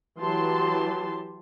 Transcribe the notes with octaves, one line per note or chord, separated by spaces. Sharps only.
E3 F#3 G4 A5 C6